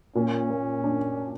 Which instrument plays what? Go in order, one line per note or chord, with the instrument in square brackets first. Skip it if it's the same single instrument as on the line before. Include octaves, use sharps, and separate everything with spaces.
[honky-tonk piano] A#2 [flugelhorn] C#4
[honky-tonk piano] A#3
D4